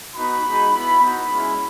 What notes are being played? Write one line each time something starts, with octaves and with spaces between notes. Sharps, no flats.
B3 D#4 F#4 B5
G#3 D#4 F#4
B3 E4 B5
B3 D#4 F#4 B5
G#3 C#4 E4